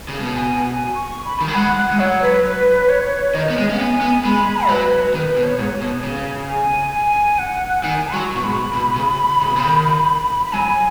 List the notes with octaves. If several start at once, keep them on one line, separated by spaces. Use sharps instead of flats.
C#3
B2
G#5
G#5
C#6
B5
D#3
F#3
G#3 F#5
F#5
G#3
F#3 C#5
B4
B4
C#5
D#3 D#5
B3
G#3
C#4
B3 G#5
B3
G#3 B5
F#3 B4
D#3 B4
B2
C#5
G#2
B2
C#3
G#5
G#5
F#5
D#3 G#5
F#3 C#6
B2
G#2 B5
B2
C#3
C#3
B2
C#3
D#3
B5
F#3 G#5